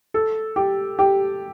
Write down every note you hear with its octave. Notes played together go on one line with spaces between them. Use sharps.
A4
G4
G4